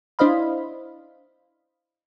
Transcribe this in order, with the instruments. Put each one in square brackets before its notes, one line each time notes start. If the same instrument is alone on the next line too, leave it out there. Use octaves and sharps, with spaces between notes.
[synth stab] D4 E4 C5 D#5 F5 B5